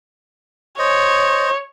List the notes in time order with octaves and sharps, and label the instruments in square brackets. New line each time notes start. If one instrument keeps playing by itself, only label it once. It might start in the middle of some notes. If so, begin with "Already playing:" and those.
[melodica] C5 D#5 [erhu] C#5